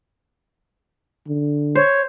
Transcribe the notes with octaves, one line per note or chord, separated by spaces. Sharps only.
D3
C5 C#5